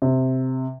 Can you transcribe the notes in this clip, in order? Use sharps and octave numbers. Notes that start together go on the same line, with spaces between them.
C3